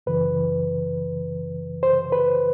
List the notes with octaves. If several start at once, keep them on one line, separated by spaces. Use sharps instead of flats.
F#2 C#3 E3 B4
C5
B4